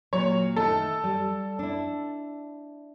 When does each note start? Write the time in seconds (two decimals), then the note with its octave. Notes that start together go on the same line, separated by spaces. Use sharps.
0.13 A#2 F#3 C#5
0.56 D#3 A3 A4
1.04 G3
1.59 D4 E4